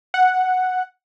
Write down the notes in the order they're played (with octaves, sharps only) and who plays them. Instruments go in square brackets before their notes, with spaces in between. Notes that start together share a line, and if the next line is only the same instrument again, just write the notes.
[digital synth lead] F#5